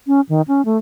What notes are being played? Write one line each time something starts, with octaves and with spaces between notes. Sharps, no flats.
C#4
D#3
C#4
A3